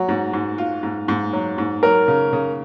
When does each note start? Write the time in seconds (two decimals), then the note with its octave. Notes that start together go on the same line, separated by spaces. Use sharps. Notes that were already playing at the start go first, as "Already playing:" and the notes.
Already playing: F#3 F#4
0.09 G#2
0.33 G#2
0.58 F4
0.83 G#2
1.08 G#2
1.33 F#3
1.58 G#2
1.83 F#3 A#4
2.08 C#3
2.33 C#3